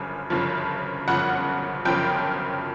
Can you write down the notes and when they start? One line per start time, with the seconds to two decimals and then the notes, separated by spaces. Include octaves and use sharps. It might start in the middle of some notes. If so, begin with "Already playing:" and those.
Already playing: G1 F#2 C#3 F3 G#5
0.30 G1 F#2 C#3 F3
1.08 G1 F#2 C#3 F3 F#5
1.85 G1 F#2 C#3 F3 G5